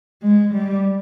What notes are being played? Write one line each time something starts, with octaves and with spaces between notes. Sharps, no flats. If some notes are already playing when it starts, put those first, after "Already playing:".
G#3
G3